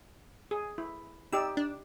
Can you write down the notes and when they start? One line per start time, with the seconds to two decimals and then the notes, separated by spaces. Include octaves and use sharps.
0.51 G#4
0.78 E4
1.33 D#4 G4 D5 E6
1.57 D4